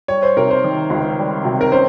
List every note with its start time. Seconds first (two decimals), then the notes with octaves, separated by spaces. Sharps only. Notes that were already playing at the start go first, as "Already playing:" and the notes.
0.08 G3 C#5
0.23 C5
0.37 C3 A#4
0.51 C5
0.64 D#3
0.90 C#2
1.18 G3
1.45 C3
1.61 A#4
1.72 C#4 C5